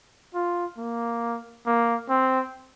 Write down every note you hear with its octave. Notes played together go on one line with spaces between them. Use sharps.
F4
A#3
A#3
C4